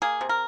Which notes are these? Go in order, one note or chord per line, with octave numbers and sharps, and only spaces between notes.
A#3 G#4
C3
A#4